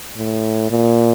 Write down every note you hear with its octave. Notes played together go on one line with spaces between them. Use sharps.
A2
A#2